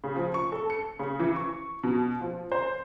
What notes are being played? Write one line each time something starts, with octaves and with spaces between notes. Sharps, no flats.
C#3
F3
C#6
A4
C#7
C#3
E3
C#6
B2
F3
C5